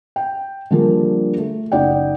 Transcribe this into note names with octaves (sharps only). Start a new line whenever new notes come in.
G5
D3 F3 G3 A#3 D4 G#4
A3
F#1 D#4 D5 F#5 G5